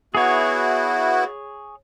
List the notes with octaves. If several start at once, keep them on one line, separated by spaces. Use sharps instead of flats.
B3 E4 F#4 G#4 C#5